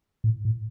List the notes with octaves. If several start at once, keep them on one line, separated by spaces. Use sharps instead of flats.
A2
A2